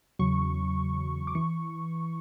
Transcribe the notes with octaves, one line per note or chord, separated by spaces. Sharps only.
E2 C#3 F#3 C#6
D6
E3 C#6